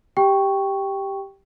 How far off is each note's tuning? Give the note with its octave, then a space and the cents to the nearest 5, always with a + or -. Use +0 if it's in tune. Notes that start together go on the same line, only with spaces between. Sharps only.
G4 +0 G5 +0 C#6 +0